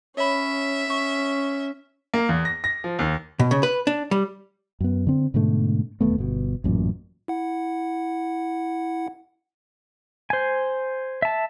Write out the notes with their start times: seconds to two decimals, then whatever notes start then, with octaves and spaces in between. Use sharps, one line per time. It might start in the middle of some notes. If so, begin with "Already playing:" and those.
0.17 C#4 C#5 E5 B5
0.90 C#4 C#6
2.14 A#3
2.29 E2
2.45 A#6
2.64 A#6
2.84 F3
2.99 D#2
3.39 B2
3.51 C#3
3.63 B4
3.87 D4
4.11 G3
4.80 F#2 B3
5.07 D3 C4
5.34 G#2 B2 D3 A3
6.01 E1 D#2 A3 B3
6.18 G1 B2
6.64 A1 F#2 A#2
7.28 E4 F#5
10.30 C5 G#5
11.22 E5 A5